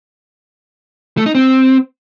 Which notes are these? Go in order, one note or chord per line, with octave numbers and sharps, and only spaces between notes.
A3
D#4
C4